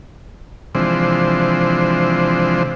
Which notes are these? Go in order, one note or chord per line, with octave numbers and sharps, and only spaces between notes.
C3 E3 F3 G#3 D4 C5